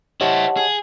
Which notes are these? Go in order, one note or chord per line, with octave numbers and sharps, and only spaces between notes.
E4 G4 C5 C#5 D#5 F#5 A5
G#4